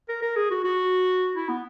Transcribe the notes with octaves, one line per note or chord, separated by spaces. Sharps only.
A#4
A#4
G#4
F#4
F#4
E4
B3